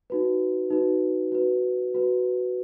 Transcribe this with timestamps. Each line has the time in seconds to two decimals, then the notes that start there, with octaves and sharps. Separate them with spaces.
0.10 D#4 F#4 B4
0.71 D#4 F#4 B4
1.32 F#4 B4
1.95 F#4 B4